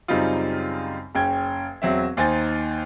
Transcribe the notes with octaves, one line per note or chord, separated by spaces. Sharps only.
F#2 C#3 G3 C4 D#4 F4
F#1 C#4 G5 G#6
E1 F#3 C4 E5
D#2 D#4 C5 G#5 A6